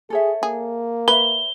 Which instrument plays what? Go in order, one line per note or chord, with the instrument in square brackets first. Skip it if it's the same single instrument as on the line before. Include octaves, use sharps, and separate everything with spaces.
[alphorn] G#4 [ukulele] A4 C#5 E5
[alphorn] A#3 [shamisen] G#4
[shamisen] B4 [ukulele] C#5 E5 [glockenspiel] G7